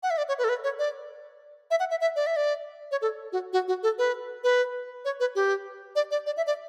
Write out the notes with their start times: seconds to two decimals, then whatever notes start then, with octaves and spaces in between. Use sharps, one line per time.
0.03 F#5
0.10 E5
0.18 D5
0.28 C#5
0.39 B4
0.44 A4
0.49 B4
0.64 C#5
0.79 D5
1.71 E5
1.80 F#5
1.91 E5
2.01 E5
2.16 D5
2.27 E5
2.36 D5
2.91 C#5
3.02 A4
3.32 F#4
3.53 F#4
3.68 F#4
3.83 A4
3.98 B4
4.44 B4
5.05 C#5
5.20 B4
5.35 G4
5.96 D5
6.11 D5
6.26 D5
6.37 E5
6.47 D5